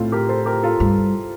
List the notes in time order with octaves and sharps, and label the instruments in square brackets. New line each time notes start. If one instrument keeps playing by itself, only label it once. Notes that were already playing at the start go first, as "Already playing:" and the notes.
Already playing: [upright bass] A2 [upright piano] C4 E4 F4 A4
[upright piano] G4 A#4
A4 C5
G4 A#4
F4 A4
[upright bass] G2